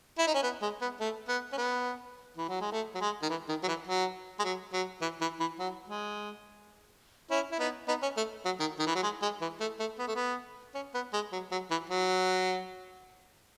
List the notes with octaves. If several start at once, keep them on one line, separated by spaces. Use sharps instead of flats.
E4
D#4
C#4
B3
G#3
B3
A3
B3
C#4
B3
E3
F#3
G#3
A3
F#3
G#3
D#3
E3
D#3
F#3
E3
F#3
G#3
F#3
F#3
E3
E3
E3
F#3
G#3
C#4 E4
E4
B3 D#4
B3 D#4
C#4
A3
F#3
D#3
D#3
E3
F#3
G#3
G#3
E3
A3
A3
B3
A3
B3
C#4
B3
G#3
F#3
F#3
E3
F#3